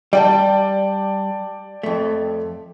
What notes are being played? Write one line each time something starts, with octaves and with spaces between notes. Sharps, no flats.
G3 D5 G5 A5
F2 A3